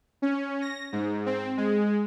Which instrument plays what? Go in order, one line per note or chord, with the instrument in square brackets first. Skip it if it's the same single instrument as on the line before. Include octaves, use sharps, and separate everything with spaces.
[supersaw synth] C#4
A#6
G#2
C4
G#3